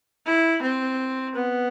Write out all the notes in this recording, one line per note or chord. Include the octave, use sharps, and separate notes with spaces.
E4
C4
B3